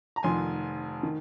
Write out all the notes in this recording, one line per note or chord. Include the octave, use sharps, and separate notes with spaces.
A#5
F1 F2 D#3 G#5 C6
D#3